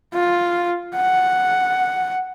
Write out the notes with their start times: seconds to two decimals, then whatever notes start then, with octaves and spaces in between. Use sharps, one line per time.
0.14 F4
0.97 F#5